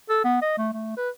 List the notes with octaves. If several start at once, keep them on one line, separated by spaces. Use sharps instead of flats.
A4
B3
D#5
A3
A3
B4